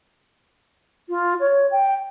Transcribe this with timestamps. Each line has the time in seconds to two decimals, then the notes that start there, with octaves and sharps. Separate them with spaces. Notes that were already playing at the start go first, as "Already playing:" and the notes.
1.09 F4
1.40 C#5
1.71 G5